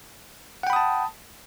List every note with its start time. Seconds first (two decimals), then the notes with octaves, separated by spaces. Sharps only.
0.63 F#5
0.67 G5
0.70 B5
0.73 D#6
0.76 A5